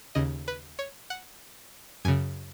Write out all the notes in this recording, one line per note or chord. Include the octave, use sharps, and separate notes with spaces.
D#2 C#3 D#5
B4
C#5
F#5
F#2 C#3 G#5